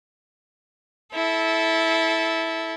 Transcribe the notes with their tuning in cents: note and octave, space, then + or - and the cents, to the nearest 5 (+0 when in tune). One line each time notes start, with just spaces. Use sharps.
E4 -10 A4 -15